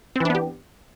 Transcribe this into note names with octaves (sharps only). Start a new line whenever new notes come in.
E3 B3 C4 D4 G4